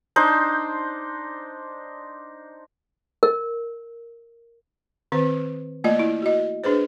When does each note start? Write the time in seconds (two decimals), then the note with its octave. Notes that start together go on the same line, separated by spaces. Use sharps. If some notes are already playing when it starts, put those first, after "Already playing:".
0.16 D4 D#4 C5
3.23 A#4
5.12 D#3 C4 B4
5.84 A3 A#3 F4 D5 D#5
5.99 E4
6.22 F#4 D#5
6.64 D4 G#4 B4 C5